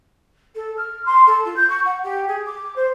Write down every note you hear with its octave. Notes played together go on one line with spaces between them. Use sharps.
A4
F6
C6
A4
F4
G6
C#6
F#5
G4
G#4
D6
C5